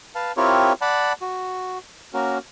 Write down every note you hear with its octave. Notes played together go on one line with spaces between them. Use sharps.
B4 F5 A5
C4 E4 F4 G4 A#4 C#5
D5 F#5 A5 B5
F#4
A#3 C#4 F#4 A#4